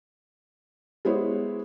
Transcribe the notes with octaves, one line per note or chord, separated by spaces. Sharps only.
G#3 B3 E4 C5 C#5